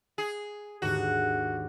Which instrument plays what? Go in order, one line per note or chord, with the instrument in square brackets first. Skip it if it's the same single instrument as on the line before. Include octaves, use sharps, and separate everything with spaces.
[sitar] G#4
[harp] D#2 G#2 D3 [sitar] F#4